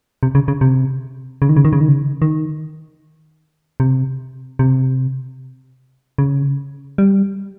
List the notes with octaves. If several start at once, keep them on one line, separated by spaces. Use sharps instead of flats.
C3
C#3
C#3
C3
C#3
D#3
C#3
D#3
C#3
D#3
C#3
D#3
C3
C3
C#3
G3